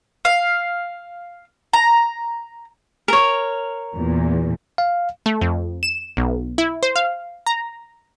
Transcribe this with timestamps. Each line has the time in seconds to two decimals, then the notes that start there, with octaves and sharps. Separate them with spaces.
0.25 F5
1.73 A#5
3.08 A#4 C#5
3.96 E2 A#2
4.78 F5
5.26 A3
5.41 F2
5.83 E7
6.17 B1
6.58 E4
6.83 C5
6.96 F5
7.46 A#5